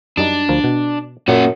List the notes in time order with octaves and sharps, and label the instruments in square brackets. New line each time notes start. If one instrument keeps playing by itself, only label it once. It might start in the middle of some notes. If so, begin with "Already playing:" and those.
[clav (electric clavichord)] F#2 G3 D#4 [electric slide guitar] D4
[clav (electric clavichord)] D2 F3 A#4
B2
[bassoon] F#2 [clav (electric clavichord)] A#2 [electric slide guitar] A#3 C#4 F#5